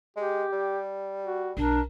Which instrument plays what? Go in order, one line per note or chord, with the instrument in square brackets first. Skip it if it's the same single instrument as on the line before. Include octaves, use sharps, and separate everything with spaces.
[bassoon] G#3 [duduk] G4
[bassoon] G3
[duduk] F#4
[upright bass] B1 [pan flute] D4 [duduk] A#4